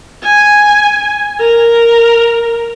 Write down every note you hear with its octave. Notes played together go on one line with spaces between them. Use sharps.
G#5
A#4